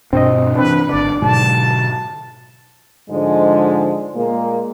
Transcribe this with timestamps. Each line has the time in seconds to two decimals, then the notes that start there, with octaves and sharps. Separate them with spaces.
0.13 G2 B2 C4 D4 C5 D#5
0.55 C3 E3 C4 D4 B4
0.89 G#1 D3 D4 D5
1.22 G#2 B2 D3 F#3 A5
3.09 G#2 D3 F3 G#3
4.15 A#2 G#3 A#3